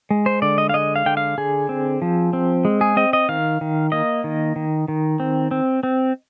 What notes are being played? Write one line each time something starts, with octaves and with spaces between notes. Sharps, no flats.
G#3
C5
D3 D5
D#5
F5
G#3 D#5
F5
D3 G5
F5
D3 G#4
C4
F3
C4
G#3
G#4
C4 D#5
D#5
D#3 F5
D#3
A#3 D#5
D#3
D#3
D#3
C4
C4
C4